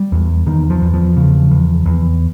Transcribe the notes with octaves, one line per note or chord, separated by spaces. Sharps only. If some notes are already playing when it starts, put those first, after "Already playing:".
Already playing: G3
E2
E2 D#3
F3
E2
F3
C#3
E2
E2